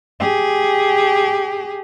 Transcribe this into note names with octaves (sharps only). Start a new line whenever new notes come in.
G4 G#4